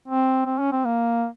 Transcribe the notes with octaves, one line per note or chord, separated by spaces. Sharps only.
C4
C4
C#4
C4
A#3